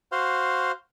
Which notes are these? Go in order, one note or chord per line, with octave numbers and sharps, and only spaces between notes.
F#4 C5 F5